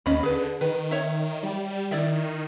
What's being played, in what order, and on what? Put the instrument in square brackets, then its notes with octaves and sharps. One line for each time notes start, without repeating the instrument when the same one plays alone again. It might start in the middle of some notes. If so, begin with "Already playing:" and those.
[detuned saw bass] D#2 [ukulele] C#4 D#5 B5
[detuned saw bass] D3 [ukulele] G#4 B4
[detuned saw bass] D#3 [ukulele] B4
[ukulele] C#5 E5
[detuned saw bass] G3
[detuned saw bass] D#3 [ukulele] E4 D5 E5